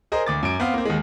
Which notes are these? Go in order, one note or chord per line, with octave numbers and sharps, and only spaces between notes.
G#4 A#4 C5 D#5
D2 D6 A6
F#2 D7
B3 C4 F5
A#3 C4
D#2 G#3